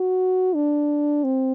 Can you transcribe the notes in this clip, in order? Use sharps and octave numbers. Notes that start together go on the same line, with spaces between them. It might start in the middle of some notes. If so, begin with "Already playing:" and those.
Already playing: F#4
D4
C4